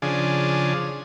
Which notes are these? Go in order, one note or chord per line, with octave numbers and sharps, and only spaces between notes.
C#3 F3 D4 G#4